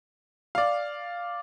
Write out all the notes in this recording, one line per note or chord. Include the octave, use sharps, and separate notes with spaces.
D5 F5